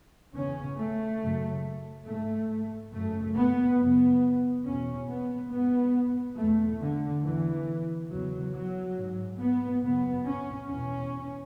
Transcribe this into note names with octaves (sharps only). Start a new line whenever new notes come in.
E2 C#3 C#4
A3
F#2 C#3
G#2 A3
F#2 C#3 A3
B3
F#2 C#3 B3
E2 B2 C#4
B3
G#2 B3
E2 B2 A3
D3
E2 B2 E3
E2 C#3 F#3
F#3
G#2
B3
F#2 C#3 B3
C#4
E2 B2 C#4